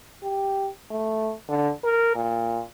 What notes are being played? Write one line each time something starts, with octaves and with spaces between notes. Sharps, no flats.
G4
A3
D3
A#4
A#2